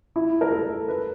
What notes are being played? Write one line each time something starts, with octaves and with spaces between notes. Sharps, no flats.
E4
A#4
A4
B4